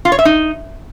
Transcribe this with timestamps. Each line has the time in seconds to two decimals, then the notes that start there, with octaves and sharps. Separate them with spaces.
0.05 F4
0.12 C#5
0.19 E5
0.25 D#4